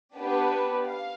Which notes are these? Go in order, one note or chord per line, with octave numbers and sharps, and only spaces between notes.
B3 D4 G4 B4
F5